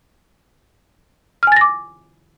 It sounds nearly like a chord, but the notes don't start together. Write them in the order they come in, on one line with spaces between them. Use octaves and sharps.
F6 G#5 A6 A#6 D6